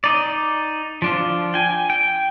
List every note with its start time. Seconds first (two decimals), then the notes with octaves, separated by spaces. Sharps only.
0.04 D#4 D5
1.02 F3 D4 F4
1.54 G5 G#5
1.90 G5